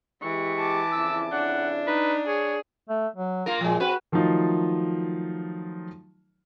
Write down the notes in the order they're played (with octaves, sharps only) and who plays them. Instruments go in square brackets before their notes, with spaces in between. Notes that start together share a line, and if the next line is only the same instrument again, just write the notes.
[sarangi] E3 [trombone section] G#3 G4 [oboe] C#6
[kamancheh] A5 D6
[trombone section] F2 C#3 E4 [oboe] E6
[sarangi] D4 [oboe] F#5
[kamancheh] D#4 [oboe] B4
[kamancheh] G#4 [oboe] C#5
[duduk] A3
F#3
[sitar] A#3 F4 A#4
[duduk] A#2 [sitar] F3 G#3
[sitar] C4 B4 [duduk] F#4
[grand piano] D#3 F3 F#3 A3 D#4 F4